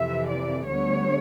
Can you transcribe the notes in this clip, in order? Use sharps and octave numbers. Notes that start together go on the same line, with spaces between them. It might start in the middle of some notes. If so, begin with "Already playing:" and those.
Already playing: F2 C3 E3 E5
D5
D2 D3 G3 B3 C#5